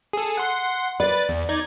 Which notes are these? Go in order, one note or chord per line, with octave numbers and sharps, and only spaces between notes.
G#4 A4
F#5 C6
B4 D5 A6
E2
D#4 D5 G#6